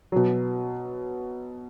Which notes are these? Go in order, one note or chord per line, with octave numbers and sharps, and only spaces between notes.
B2 F#3